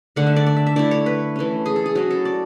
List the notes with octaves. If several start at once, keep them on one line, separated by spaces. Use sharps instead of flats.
D3 A3 D4 F#5
E5
D5
D5
E5
E5
D3 A3 E4 D5
C#5
B4
E3 A3 C#4
G#4
A4
G#4
F#3 C#4 E4 F#4
A4
D5